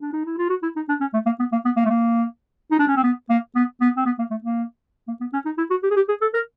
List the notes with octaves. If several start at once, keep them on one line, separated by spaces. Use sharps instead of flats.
D4
D#4
E4
F4
F#4
E4
D#4
D4
C#4
A3
A#3
B3
A#3
B3
A#3
A3
A#3
D#4
D4
C#4
C4
B3
A#3
B3
B3
C4
B3
A#3
A3
A#3
A#3
B3
C#4
D#4
E4
F#4
G4
G#4
G4
G#4
A4
A#4